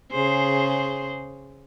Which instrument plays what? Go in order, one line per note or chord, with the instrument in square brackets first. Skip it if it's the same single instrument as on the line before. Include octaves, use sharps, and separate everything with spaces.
[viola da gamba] C#3 G#4 C5